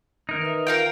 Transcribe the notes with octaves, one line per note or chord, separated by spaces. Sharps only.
D#3 E3 D#4 A#4
B4 E5
F4 A#4 F5 G5